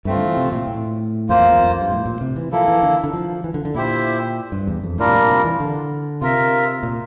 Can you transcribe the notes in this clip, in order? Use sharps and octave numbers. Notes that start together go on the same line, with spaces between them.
G2 A3 C4 F4
D3
E3
C3
A#2
A2
F2 A#3 F4 C5
E2
E2
F2
F2
G2
A2
A#2
C3
E3
F3 A#3 E4 A4
E3
D3
D3
F3
E3
D3
D3
A#2 E4 G4 C5 E5
G2
E2
F2
A2 G3 D4 F4 A#4
C3
A#2
C3
E3
D3
C3 F4 A#4 E5
A#2